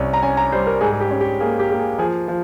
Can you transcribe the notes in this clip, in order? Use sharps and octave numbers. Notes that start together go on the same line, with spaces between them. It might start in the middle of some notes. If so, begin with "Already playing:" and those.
Already playing: C2 C#4
A#5
C#4 G#5
A#5
G3 C5
A#4
G#2 G#4
G#4
G4
C#4
G4
A#3 G#4
G4
A#3 G4
G#4
F3 G#4
F3